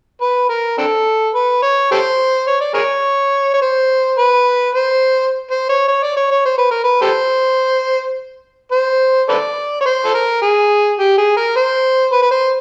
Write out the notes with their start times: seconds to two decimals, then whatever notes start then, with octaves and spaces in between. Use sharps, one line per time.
0.21 B4
0.49 A#4
0.78 C4 D4 A4
1.34 B4
1.62 C#5
1.92 G4 A4 C5
2.48 C#5
2.61 D5
2.74 G#4 A#4 C#5
3.54 C#5
3.62 C5
4.18 B4
4.75 C5
5.51 C5
5.69 C#5
5.88 C#5
6.03 D5
6.16 C#5
6.31 C#5
6.45 C5
6.58 B4
6.71 A#4
6.84 B4
7.01 G4 A4 C5
8.72 C5
9.29 A4 B4 D5
9.81 C#5
9.86 C5
10.05 A4
10.15 A#4
10.42 G#4
11.00 G4
11.18 G#4
11.37 A#4
11.56 C5
12.12 B4
12.22 B4
12.31 C5